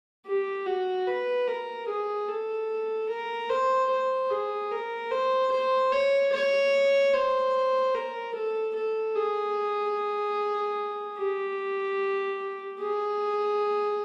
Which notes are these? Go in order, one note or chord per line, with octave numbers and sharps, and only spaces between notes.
G4
F#4
B4
A#4
G#4
A4
A#4
C5
C5
G#4
A#4
C5
C5
C#5
C#5
C5
A#4
A4
A4
G#4
G4
G#4